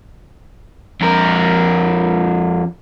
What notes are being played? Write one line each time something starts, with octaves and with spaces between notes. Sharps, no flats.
F2 A#4